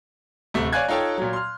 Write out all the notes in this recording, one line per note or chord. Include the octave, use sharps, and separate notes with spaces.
D1 C3 A3
C#5 D5 F5 G#5 F#6 G#6
D#4 F4 A4 C#5 G5
A#2 F#3
C6 F6